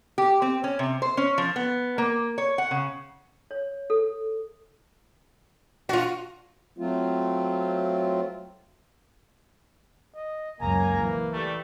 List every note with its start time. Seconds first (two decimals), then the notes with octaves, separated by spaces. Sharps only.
0.18 G4
0.42 C4
0.64 C#4
0.79 C3
1.02 C5
1.17 C#4
1.38 F3
1.56 B3
1.98 A#3
2.38 C#5
2.58 F#5
2.71 C#3
3.51 C#5
3.90 A4
5.89 D4 F4 F#4
6.78 F#3 A3 C4 F4
10.15 D#5
10.61 C#2 F#2 A#3 G#5 A#5
10.99 E3
11.33 G3 A3